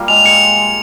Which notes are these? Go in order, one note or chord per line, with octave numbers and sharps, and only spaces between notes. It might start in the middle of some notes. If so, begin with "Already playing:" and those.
Already playing: G3 A#3 F4
G#3 F7
G#4 C#7